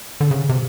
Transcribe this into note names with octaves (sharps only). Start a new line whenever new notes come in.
D3
C#3
C3